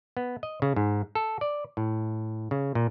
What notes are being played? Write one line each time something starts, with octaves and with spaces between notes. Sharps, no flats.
B3
D#5
C#3
G#2
A4
D5
A2
C#3
A#2